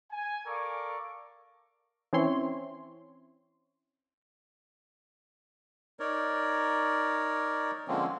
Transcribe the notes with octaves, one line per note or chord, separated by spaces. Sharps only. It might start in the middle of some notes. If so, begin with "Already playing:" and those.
G#5
A4 A#4 D5 F5 C#6 D6
E3 C4 C#4 E4 C#5 C6
D#4 A#4 C#5 D5
D3 F3 G#3 A#3 C4 C#4